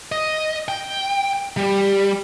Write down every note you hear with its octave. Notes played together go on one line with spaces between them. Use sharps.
D#5
G5
G3